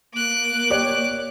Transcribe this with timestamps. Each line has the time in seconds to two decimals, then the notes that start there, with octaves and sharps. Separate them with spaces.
0.14 A#3 D6 F#6
0.70 G4 C#5 D5